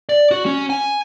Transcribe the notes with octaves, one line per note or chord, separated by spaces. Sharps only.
D5
F#4
C#4
G#5